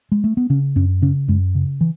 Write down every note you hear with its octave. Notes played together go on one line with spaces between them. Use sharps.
G#3
A3
B3
C#3 C#4
F#2 C#4
C#3 C#4
F#2 G#3
C#3
E3